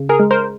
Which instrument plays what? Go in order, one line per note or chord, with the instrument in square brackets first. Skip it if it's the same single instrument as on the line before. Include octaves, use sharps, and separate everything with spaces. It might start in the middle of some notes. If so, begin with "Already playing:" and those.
Already playing: [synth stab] C#3
G#4 A#4
G#3
A#4 C5